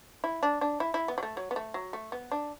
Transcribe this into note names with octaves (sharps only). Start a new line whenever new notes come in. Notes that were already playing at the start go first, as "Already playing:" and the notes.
E4
D4
D4
E4
E4
B3
F#3
A3
F#3
B3
A3
F#3
A3
B3
D4